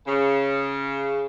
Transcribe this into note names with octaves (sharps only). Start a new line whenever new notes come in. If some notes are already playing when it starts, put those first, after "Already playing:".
C#3